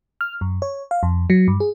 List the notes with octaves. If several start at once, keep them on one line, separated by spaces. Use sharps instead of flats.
F6
F#2
C#5
F5
F2
F#3
G2
G#4